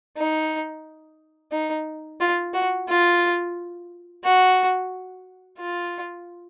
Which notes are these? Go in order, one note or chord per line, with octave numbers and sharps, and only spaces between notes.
D#4
D#4
F4
F#4
F4
F#4
F4